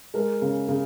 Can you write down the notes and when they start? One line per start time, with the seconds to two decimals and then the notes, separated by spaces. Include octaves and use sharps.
0.14 G#3 A#4
0.42 C#3
0.68 C#3